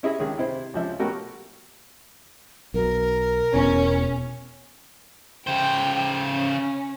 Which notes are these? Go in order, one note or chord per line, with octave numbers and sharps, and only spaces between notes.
C#4 E4 G#4 D#5 E5
C#2 D#3 G#4
C3 E4 C5
C#2 F3 E5
B2 A3 C#4 F#4 G4 A#4
B1 B2 A#4
E1 E2 B2 B3 C#4
C#3 C5 G5
C#4